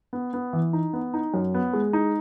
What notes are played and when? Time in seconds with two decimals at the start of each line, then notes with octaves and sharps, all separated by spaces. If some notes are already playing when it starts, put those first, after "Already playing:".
0.13 B3
0.33 B3
0.53 E3
0.73 D#4
0.93 B3
1.14 D#4
1.34 F#2
1.54 B3
1.73 G#3
1.93 D#4